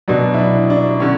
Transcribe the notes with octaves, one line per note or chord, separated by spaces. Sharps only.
B2 F#3 D4
E4
D4
D4
D3 C#4